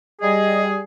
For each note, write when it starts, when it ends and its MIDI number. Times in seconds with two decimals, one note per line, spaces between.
0.22 0.80 55
0.22 0.80 68
0.22 0.61 75